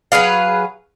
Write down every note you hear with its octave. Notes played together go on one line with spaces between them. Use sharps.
F#3 G#4 B4 F5